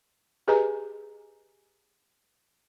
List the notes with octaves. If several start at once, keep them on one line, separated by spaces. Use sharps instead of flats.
G4 G#4 B4 D#5 G#5 A#5